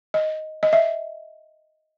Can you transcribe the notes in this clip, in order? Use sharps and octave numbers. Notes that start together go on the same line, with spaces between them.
D#5
D#5
E5